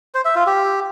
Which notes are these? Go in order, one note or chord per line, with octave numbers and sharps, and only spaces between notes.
C5
E5
F4
G4